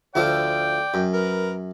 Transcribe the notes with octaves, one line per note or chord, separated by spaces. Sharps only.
D2 D3 F3 D5 G5
F#2
A#4 B4